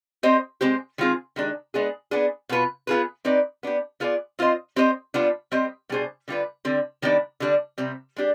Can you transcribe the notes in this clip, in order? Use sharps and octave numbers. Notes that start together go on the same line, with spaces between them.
C4 G4 C5 D#5
G#3 C4 G4 C5
D#3 G#3 C4 F4 G#4
D#3 G#3 D4 G4
G#3 B3 D4 G#4
B3 D4 G#4
B2 B3 F4 B4
B3 F4 G#4 B4
C4 D#4 B4 D5
B3 D4 G4
B3 F4 G#4 B4 D5
C4 F4 C5 D#5
C4 G4 C5 D#5
G3 B3 D4 F4
G3 C4 G4 C5 D#5
B2 G3 D4 G#4 C5
D3 G3 D4 F4 B4
D3 G3 C4
D#3 G3 B3 D4
D3 G3 D4
C3 G3 C4
G#3 D4 G4